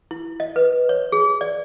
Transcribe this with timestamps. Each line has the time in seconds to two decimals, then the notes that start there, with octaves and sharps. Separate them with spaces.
0.11 E4
0.40 D#5
0.56 B4
0.89 C#5
1.12 G#4
1.41 D5